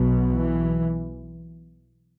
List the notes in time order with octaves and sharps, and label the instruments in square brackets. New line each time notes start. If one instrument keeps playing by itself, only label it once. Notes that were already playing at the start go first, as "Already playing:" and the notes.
Already playing: [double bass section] B1 B2
E3